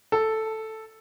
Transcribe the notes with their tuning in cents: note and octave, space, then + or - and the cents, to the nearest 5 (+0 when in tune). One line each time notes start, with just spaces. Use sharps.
A4 +0